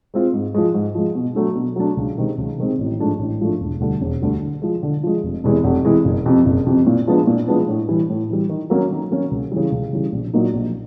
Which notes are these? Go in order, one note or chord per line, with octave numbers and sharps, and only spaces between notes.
G#3 C4 F4
G#2
F3 G#3
G#2
F3 G#3
B2
F#3 A3 D4
B2
F#3 A3 D4
C#2
C3 D#3 G#3 C4
C#2
C3 D#3 G#3 C4
A1
G#2 F3 A3 D4
A1
G#2 F3 A3 D4
E1
D2 D3 G3
E1
D2 D3 G3
D3
F3 G#3
D3
F3 G#3
F1
E2 C3 E3 G#3
F1
E2 C3 E3 G#3
F#1
F2 C3
F#1
F2 C3
A#2
F3 G#3 B3 D4
A#2
F3 G#3 B3 D4
A2
E3 G3
A2
E3 G3
D#3
F#3 A#3 C#4 F#4
D#3
F#3 A#3 C#4 F#4
C#2
C#3 E3 G3
C#2
C#3 E3 G3
A#1
A#2 F#3 A#3 D#4
A#1